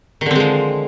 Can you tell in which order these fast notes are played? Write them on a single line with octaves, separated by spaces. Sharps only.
D#3 D3 C4 G#3 F3